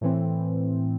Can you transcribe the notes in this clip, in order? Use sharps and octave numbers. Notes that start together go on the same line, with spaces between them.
A2 E3 C4